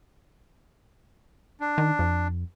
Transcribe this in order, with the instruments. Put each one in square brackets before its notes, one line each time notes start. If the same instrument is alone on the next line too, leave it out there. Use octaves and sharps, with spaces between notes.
[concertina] D4
[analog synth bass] D#3
F2